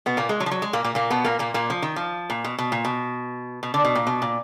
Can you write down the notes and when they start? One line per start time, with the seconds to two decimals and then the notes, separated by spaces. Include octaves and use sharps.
0.06 B2 B3
0.17 A#2 A#3
0.29 G#3
0.40 F#3
0.46 F3
0.51 F#3
0.62 G#3
0.73 A#2 A#3
0.84 A#2 A#3
0.95 A#2 A#3
1.10 B2 B3
1.25 A#2 A#3
1.39 A#2 A#3
1.54 A#2 A#3
1.70 F3
1.82 D#3
1.96 F3
2.30 A#2
2.44 B2
2.58 B2
2.72 A#2
2.85 B2
3.63 B2
3.74 D3
3.85 B2
3.95 A#2
4.07 B2
4.22 A#2